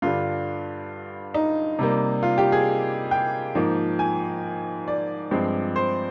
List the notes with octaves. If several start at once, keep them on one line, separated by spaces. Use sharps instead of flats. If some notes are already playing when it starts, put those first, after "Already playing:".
G2 D3 G3 F4
D#4
C3 G3 A#3
F4
G4
G#4
G5
G#2 F3 A#3
G#5
D5
G2 F3 G#3 C4
C5